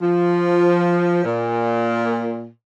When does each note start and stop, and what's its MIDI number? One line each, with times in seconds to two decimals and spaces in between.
0.01 1.22 53
1.25 2.49 46